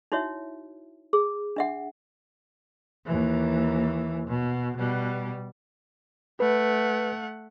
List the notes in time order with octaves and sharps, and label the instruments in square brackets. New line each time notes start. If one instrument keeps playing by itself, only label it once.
[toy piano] D#4 E4 F#4 C#5 E5
G#4
D4 E5 F#5
[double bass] D#2 E3
B2
B2 G3
[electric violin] A3 F#5 [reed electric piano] B4